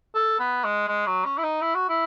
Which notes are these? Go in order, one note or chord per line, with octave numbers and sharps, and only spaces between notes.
A4
B3
G#3
G#3
F#3
C#4
E4
D#4
E4
F#4
E4